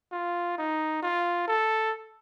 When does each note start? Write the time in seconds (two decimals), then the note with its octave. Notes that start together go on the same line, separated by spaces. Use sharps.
0.12 F4
0.58 D#4
1.02 F4
1.47 A4